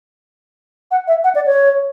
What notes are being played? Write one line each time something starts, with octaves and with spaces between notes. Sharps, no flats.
F#5
E5
F#5
D5
C#5